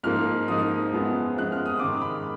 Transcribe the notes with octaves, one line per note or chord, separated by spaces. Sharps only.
G#2 F3 A#3 D#4 F6
G#2 F3 A#3 D#4 D#6
F#2 F3 G#3 B3
F#2 F3 G#3 B3 F#6
F6
D#6
G#2 D#3 G#3 D6
B5